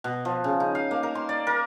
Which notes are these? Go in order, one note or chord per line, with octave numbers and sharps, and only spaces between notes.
B2
F3
C#3
D#4
F5
A#3
A#4
C6
D5
A#4